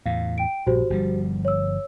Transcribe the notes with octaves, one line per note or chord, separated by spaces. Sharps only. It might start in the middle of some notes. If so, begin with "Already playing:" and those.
E2 A2 F5
G5 D7
A#1 G2 F#4 G4 C5
G1 F3 G3
C#5 E6